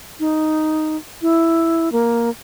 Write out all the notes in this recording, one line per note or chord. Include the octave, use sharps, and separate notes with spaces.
D#4
E4
A#3